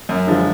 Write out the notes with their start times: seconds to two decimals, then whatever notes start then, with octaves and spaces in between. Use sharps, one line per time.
0.09 F#2
0.27 D3 F3 G#3